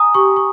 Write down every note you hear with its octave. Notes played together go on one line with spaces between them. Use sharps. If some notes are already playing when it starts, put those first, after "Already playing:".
Already playing: G#5 A#5 D#6
G4 C#6
C#6